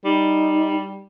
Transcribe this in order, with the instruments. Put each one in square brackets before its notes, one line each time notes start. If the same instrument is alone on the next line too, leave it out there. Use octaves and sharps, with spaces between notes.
[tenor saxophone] G3 [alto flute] D#4